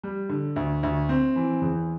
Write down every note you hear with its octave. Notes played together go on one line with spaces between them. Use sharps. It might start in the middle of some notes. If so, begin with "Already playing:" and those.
G3
D3
D2
D2
C4
E3
E2